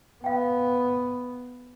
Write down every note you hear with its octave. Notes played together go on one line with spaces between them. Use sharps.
B3 F5 G5